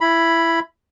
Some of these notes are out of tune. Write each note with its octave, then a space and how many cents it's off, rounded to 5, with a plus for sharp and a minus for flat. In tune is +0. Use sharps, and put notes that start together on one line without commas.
E4 +15 B5 +0